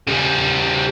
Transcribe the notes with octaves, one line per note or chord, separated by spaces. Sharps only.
C#3 G3